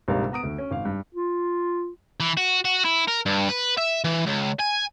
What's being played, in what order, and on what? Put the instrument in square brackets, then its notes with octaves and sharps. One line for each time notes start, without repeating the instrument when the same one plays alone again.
[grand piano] A#1 G#2 C3 G3 A#4 F5
B3 A#5 D#6 D7
D2
C#4
G#1 F5
G2
[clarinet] F4
[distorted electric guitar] E3
F#4
F#4
E4
A#4
G2
B4
E5
E3
C#2
G#5